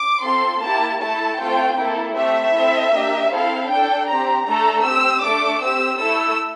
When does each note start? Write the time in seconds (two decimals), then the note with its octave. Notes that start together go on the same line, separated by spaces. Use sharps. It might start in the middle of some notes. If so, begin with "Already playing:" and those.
Already playing: D6
0.23 C4 F4 A4 C6
0.62 A#3 E4 G4 A5
1.00 A3 E4 A4 A5
1.38 A3 C4 F4 A4 G5
1.77 A#3 E4 A4
2.15 A3 C4 G4 E5
2.54 C4 E4 A4
2.92 A#3 D4 G4
3.30 C4 E4 A4 F5
3.69 D4 A4 G5
4.07 C4 G4 A#5
4.45 A3 D4 A4 A#5
4.84 C4 G4 E6
5.22 A3 D4 A4 D6
5.61 C4 G4 E6
5.99 A3 E4 A4 E6